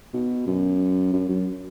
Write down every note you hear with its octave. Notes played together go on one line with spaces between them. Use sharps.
B2
F#2
F#2
F#2